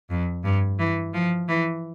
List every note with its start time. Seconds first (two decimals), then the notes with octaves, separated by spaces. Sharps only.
0.10 F2
0.44 G2
0.79 E3
1.14 F3
1.48 E3